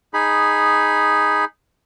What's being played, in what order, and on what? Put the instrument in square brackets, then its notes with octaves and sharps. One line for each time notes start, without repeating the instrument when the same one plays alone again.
[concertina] D#4 G#4 B5